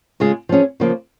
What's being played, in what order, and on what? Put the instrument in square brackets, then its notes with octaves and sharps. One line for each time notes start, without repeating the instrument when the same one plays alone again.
[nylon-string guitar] C#3 G#3 F4 G#4
F3 C#4 G#4
C#3 F3 A#3